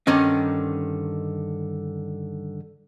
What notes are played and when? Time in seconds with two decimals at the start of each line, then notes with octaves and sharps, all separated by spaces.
0.07 G2 D3 D#3 C#4 D#4